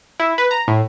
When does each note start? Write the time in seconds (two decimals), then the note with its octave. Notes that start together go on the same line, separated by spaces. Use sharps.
0.20 E4
0.38 B4
0.51 A#5
0.68 A2